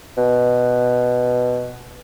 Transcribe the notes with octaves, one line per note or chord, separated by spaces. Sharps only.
B2